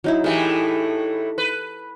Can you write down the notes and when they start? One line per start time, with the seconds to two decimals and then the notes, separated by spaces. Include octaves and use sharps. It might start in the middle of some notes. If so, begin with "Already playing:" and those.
0.04 F#3 D#4 E4
0.24 A2 E3 A3 G4 G#4 A#4
1.38 B4